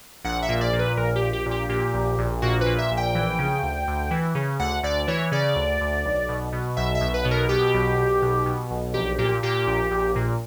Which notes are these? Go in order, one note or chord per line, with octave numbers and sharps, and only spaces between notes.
A#1 F#5
E5
A#2
D5
A#2
B4
A#1 A#4
G4
A#1
G4
A#2
G4
A#2 G4
A#1
A#1
A#2 F#4
A#2 B4
E5
A#1
G5
E3
C#3
D2
D2
E3
C#3
D2 F#5
D2 D5
E3 C#5
C#3 D5
D2
D2
B1
B2
B2
B1 E5
E5
B1
B4
B2
A#4
B2 G4
B1
B1
B2
B2
B1
A#1 G4
A#2 G4
A#2 G4
A#1
A#1
A#2